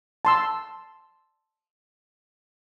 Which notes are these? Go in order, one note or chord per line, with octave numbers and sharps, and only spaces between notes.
A5 C6 E6